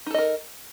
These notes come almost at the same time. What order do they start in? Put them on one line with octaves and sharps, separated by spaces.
D#4 A4 D#5 A#4